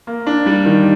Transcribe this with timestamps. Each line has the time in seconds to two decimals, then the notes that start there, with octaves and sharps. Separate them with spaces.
0.07 A#3
0.27 D4
0.46 G3
0.65 D#3